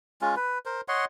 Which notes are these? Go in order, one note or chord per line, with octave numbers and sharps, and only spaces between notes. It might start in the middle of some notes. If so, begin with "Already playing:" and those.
G#3 C#4 F4
B4
A#4 C5
C#5 D#5 F#5 C6